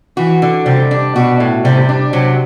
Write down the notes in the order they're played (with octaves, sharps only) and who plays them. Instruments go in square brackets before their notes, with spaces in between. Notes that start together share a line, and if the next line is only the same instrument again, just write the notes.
[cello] E3 [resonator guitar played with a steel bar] F#4
[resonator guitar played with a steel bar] D3
[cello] C3 [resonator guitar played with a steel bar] G3
[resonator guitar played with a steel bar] D4
[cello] B2 [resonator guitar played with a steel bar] F#4
[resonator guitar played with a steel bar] A2
[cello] C3 [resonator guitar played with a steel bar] G3
[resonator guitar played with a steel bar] D4
[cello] C3 [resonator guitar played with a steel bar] F#3